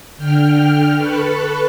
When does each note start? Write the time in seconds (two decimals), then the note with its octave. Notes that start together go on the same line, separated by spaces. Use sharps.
0.18 D3 G5 F6
0.97 A4 B4 C#6 F#6